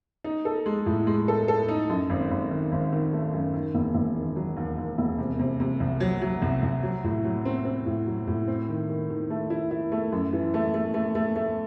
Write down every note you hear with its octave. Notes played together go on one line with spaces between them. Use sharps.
D#4
A4
G#3
A2
G#3
A4
A4
D#4
F#2
G#1
G#1
D#3
G#1
D#3
A3
F#2
D#3
E1
E1
D#3
F#3
D#2
D#2
E1
C3
C3
C3
C2
F#3
F#3
C2
C2
F#3
A2
F#3
C4
C4
A2
F#3
A2
C4
D#3
D#3
D#3
A3
E4
E4
A3
F#2
E3
A3
A3
A3
A3
A3